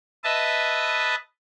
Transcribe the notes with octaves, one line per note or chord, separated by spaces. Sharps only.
B4 D#5 E5 A5